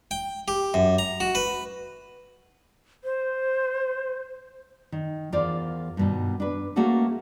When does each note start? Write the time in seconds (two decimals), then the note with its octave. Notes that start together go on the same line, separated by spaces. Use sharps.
0.11 G5
0.48 G4
0.74 F#2
0.99 A#5
1.20 F#4
1.35 B4
3.04 C5
4.92 D#3
5.32 E2 F4 A#4 C5 D5
5.97 G2 B2 D#3
6.40 D4 B4
6.76 A3 A#3 C#4 F#4 G#4 A4